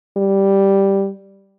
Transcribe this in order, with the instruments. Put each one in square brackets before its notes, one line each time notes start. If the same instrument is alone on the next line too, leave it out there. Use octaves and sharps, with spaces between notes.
[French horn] G3